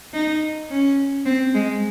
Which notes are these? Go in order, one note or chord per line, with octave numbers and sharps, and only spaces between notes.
D#4
C#4
C4
G#3